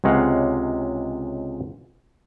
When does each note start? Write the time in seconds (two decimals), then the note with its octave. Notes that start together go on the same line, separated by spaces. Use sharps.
0.04 C#2 C3 G#3 C#5 F5 F#5